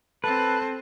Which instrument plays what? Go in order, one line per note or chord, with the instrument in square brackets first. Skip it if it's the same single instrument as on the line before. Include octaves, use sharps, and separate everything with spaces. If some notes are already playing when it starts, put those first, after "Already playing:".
[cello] C4 [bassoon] A4 [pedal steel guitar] B4 [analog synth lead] A5